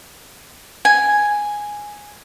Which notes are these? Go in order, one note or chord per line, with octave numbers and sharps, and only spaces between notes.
G#5